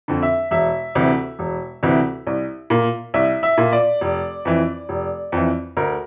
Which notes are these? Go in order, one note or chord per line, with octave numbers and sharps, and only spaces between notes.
F2 D3
E5
E1 E5
D2 C3 E3
E1
D2 C3 E3
C2
A#2
C2 E5
E5
A#2
D5
F1
F2 E3
F1
F2 E3
D2 A#4